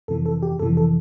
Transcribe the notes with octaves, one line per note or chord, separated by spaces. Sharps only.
F2 C3 E3 A4
A4
G4
F2 C3 E3 A4
A4